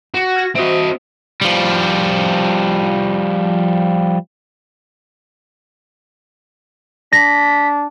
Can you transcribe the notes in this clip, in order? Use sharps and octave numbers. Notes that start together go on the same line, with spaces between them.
F#4
F6 G#6 A#6
C4 F#4 C5 D#5 E5
F3 G3
D4 A#6 B6